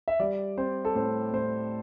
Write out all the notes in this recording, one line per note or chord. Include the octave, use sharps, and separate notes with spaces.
E5
G3 D5
C4 C5
A4
A2 C5
A2 C5